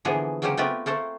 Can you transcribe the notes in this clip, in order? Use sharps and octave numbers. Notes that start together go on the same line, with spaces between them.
D3 E3 F3 A#3 B3 G#4
C#3 F#3 A#3 C#4 G4 C5
A3 B3 C4 F4 G4 B4
A3 A#3 A4 C5